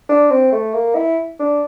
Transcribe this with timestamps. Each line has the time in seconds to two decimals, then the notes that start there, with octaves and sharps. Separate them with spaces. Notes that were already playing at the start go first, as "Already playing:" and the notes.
0.09 D4
0.30 C4
0.52 A3
0.73 A#3
0.95 E4
1.39 D4